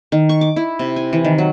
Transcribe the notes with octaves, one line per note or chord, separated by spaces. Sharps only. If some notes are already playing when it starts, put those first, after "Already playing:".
D#3
C#6
D6
E4
C3
G#5
E3
D#3
F#3